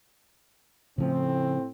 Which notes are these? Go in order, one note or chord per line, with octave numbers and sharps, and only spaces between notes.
A2 C#3 F3 C4